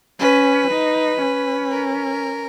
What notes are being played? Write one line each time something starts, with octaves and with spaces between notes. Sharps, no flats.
C#4 B4
D#4
C#4
A#4